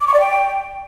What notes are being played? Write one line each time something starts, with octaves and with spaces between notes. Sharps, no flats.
D6
C#6
D5
G5